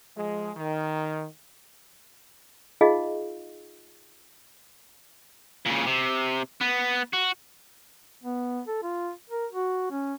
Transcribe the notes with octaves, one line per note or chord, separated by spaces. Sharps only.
F3 G#3
D#3
D#4 F4 G#4 D#5 F5
A#2 C#3
C3
B3
F#4
B3
A4
F4
A#4
F#4
C#4